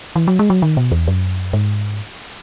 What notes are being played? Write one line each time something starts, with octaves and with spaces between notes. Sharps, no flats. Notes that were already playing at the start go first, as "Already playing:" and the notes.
E3
F#3
G#3
F#3
D#3
B2
E2
F#2
G#2